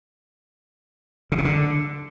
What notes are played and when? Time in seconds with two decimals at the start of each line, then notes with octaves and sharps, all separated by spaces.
1.32 C#3
1.38 C3
1.45 D3